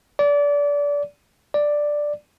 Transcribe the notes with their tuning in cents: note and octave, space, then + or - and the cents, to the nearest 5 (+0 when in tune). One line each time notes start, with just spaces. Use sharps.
D5 -25
D5 +5